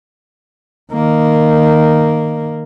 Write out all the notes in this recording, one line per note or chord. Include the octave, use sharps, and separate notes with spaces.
D#3 A#3